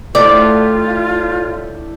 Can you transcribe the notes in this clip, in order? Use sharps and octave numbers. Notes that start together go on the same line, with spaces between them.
A2 D4 F4 G4 D5